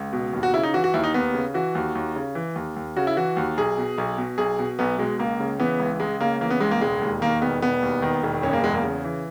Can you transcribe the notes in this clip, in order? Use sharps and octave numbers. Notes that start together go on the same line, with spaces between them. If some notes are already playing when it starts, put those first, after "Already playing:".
Already playing: C#2
B2
D#2
F#4
C#3 E4
D#4
E3 F#4
F#4
D#2 E4
D#4
D#2 B3
C#3
E3 F#4
D#2
D#2
C#3
E3
D#2
D#2
C#3 F#4
E4
E3 F#4
D#2
B1 G#4
B2
B1
B2
B1 G#4
B2
B1 B3
B2 G#3
C#2 A#3
C#3
E3 B3
C#2
C#2 G#3
C#3 A#3
E3 A#3
B3
C#2 G#3
A#3
E1 G#3
D#2
D#3 A#3
E1 B3
E1 B3
D#2
D#3
E1
F#1 C#4
A#3
E2 G#3
A#3
C#3
E3